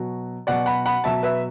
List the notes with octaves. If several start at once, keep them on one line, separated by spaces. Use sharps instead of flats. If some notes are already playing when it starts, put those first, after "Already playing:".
Already playing: B2 F#3
B2 F#3 D5 F#5
F#5 B5
F#5 B5
B2 F#3 E5 A5
B4 E5